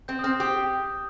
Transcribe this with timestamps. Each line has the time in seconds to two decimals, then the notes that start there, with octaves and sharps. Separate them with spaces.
0.08 C4 G6
0.19 D#6
0.23 C4 F6
0.40 G4 D#6